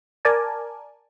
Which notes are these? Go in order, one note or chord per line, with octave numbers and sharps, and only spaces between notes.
A#4 D5 G#5 A5